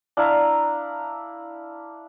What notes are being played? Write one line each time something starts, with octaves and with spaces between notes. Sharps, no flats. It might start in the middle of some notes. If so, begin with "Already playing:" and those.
D4 E4 F5 A#5